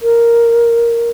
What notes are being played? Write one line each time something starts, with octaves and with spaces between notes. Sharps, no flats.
A#4